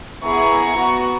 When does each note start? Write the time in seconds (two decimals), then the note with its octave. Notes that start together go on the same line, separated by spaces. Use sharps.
0.24 B3 E4 G#4 A#5 C#6
0.77 B3 F#4